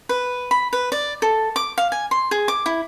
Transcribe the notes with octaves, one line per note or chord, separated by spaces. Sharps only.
B4
B5
B4
D5
A4
D6
F5
G#5
C6
G#4
D6
E4